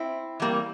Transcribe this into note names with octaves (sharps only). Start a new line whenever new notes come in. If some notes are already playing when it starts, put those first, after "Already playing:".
Already playing: C4 E4
E3 G3 A#3